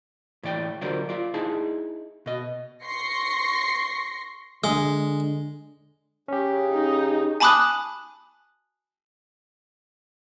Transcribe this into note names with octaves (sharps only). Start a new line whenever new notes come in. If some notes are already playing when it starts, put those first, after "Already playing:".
A2 E3 D5 G5
D3 F#3 F4 A#4 C5 D5
F4 D5
D#4 E4 G#4 A5
B2 D#5
C6 C#6 A#6 C7 C#7
D3 G#3
C#3 C#4 G4
D#4
G#5 A5 B5 D6 D#6 F#6